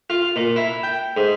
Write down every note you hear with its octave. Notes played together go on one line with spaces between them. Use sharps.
F4
A#2
E4
G5
G#2